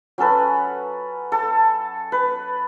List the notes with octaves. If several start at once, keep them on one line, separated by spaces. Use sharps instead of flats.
F#3 C#4 A4 B4
A4
B4